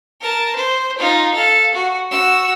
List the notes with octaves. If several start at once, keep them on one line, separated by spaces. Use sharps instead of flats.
A#4 A5
C5
D#4 F4
A4 F5
F#4
F#4 E6